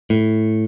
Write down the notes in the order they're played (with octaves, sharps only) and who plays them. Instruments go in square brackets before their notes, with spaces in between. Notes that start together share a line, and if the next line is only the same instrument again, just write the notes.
[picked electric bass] A2